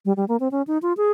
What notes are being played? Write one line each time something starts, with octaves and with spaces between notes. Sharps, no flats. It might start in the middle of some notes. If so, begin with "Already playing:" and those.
G3
G3
A#3
C4
C#4
D#4
F4
G#4